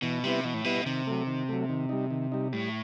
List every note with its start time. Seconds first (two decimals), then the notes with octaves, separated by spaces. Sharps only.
0.02 B2 E3
0.23 C3 G3 B3 E4 B4
0.45 B2 E3
0.54 A2
0.64 B2 G3 B3 E4 B4
0.86 C3 D#3
1.07 F#3 A3
1.27 D#3
1.49 F#3 A3
1.69 D#3
1.89 G3 D#4
2.11 D#3
2.32 G3 D#4
2.52 A2 G3